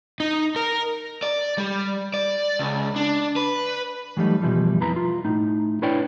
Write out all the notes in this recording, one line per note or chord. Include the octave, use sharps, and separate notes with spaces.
D#4
A#4
D5
G3
D5
C#2
D4
B4
E3 F#3 G3 A3 D#4
B2 E3 F3 G3
F2 E3 B4 A#5
F4
A2 D#4
D4 E4 B4 C#5 D5 G5